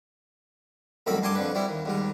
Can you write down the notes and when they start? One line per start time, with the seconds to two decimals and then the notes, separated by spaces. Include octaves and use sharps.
1.06 C2 F#2 A2 D#3 E5 B5
1.23 G2 G#5 A5 C6 D6
1.35 F2 D3 B4
1.55 G3 C4 E4
1.68 D#2
1.85 D#2 G#2 G3